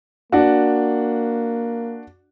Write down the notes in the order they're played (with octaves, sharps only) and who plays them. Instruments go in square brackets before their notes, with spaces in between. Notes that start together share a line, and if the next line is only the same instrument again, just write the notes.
[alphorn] A#3 [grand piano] D4 F#4